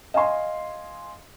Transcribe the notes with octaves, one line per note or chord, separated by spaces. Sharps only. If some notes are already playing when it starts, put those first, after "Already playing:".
D#5 F5 G#5 C6